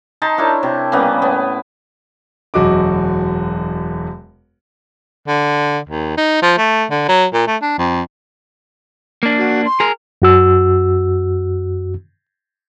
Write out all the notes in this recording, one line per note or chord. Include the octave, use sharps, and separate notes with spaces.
D#4 A5 A#5 C6
D4 E4 A#4 C#5
C3 A5
C#3 G3 A#3 B3
A2 B3
E1 F#2 F#4 D#5 D6
D3
D#2
D#4
F3
A3
D3
F#3
A#2
A3
D4
F2
A#3 D4
F#4
C6
G#4 A#4
F#2 F#4 E6